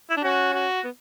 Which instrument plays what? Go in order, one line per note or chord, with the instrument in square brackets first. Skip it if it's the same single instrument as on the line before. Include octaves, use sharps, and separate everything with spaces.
[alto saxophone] E4
D4
[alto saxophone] C#4 [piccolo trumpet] F#4
[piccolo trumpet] F#4
[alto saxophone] B3